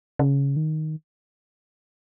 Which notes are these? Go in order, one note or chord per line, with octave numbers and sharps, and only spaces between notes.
C#3
D#3